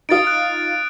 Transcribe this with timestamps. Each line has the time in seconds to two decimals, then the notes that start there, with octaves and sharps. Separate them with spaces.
0.09 D#4 F4 D#6 A6 D7
0.27 F#6 D7